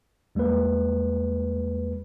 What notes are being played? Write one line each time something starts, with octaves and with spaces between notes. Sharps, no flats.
E2 G3 G#3 A#3 B4